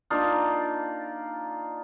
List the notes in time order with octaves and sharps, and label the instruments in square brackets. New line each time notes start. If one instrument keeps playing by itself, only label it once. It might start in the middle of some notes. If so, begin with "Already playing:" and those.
[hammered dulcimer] A#3 D4 D#4 F4